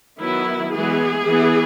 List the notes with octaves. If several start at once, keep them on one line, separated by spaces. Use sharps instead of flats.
D#3 F#3 B3 E4
E3 G#3 B3 G#4
E3 B3